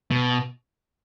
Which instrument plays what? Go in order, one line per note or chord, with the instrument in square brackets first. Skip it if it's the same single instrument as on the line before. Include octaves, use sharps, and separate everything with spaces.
[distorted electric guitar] B2